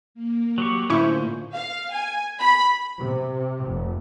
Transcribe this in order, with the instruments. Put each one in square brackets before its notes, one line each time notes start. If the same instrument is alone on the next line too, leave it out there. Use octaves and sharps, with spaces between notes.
[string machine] A#3
[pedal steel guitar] F#3 G4 C#6
[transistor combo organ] A2 D3 F4 [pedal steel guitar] C#4 C5 [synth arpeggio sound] E4 C#6
[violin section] F5
G#5
B5
[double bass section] C3
F1